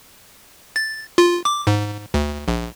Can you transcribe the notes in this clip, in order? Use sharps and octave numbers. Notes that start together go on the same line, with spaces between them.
A6
F4
D6
G#2
D2
A#1